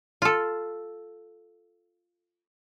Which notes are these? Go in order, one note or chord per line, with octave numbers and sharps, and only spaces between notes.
F4 A4